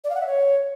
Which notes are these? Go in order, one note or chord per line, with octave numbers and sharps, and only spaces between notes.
D5
F5
F#5
E5
C#5